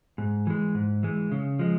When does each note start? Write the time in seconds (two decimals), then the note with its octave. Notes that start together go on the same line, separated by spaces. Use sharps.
0.18 G#2
0.47 E3 G#3
0.75 G#2
1.03 E3 G#3
1.32 C#3
1.59 F3 G#3